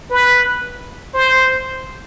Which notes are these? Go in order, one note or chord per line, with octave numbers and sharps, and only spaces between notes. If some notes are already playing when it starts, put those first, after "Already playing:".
B4
C5